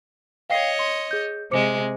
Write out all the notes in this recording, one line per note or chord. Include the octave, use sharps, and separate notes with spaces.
C#5 D#5 F5 G5 C7
C6
G#4 G6
C3 G#3 C5 D6 C#7